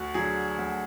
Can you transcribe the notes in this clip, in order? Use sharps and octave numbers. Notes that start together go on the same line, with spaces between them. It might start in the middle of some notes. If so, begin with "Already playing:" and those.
Already playing: D2 F#4
D3 F#3 G#4
D2